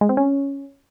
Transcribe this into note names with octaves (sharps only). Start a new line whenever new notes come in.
G#3
C4
C#4